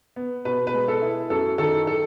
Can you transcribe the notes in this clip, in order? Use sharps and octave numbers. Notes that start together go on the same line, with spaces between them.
B3
B2 B4
B4
G#3
A4
E4
F#2 A4
D#3 A4
A4